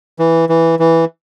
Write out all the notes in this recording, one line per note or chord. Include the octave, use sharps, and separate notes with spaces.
E3
E3
E3